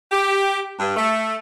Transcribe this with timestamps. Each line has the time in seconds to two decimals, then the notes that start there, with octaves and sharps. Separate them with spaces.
0.12 G4
0.80 G2
0.97 A3